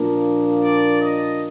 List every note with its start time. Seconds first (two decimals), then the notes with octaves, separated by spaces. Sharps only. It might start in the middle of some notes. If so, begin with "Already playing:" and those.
Already playing: A#2 F3 A#3 D4
0.62 D5
1.01 D#5